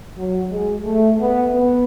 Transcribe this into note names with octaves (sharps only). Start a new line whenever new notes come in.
F#3
G#3
A3
B3
B3